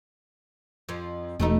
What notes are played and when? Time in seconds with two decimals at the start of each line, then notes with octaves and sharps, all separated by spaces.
0.89 F2 F3
1.40 E1 A3 B3 D#4